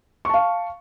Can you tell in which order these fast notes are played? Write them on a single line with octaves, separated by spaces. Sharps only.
C#6 A5 F5